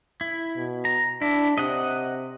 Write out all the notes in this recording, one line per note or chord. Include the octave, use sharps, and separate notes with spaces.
E4
B2
A#5
D4 E4
C3 D#5 F#5 D#6